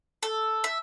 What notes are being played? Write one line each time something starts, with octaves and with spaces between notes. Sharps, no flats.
A4
E5